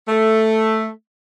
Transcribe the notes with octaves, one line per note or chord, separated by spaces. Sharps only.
A3